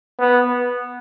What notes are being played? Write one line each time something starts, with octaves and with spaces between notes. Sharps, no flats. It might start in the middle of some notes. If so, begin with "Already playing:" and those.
B3